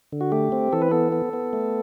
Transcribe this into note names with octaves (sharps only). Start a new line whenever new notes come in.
D3
F#4
A3 G4
C4
E3 A4
B4
B3 A4
B3
B3
A3